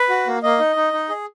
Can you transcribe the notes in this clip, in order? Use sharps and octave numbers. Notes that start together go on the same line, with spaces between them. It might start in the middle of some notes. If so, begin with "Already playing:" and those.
Already playing: B4
F#4
A#3
A#3 D#5
D#4
D#4
D#4
G#4